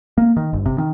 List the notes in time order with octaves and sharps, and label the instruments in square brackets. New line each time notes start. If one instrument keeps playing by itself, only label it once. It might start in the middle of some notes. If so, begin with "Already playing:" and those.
[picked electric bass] A#3
D#3
G1
C3
D#3